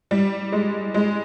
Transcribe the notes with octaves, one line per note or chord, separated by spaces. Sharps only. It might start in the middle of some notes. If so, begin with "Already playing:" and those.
G3
G#3
G#3